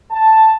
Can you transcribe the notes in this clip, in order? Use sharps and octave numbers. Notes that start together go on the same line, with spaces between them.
A5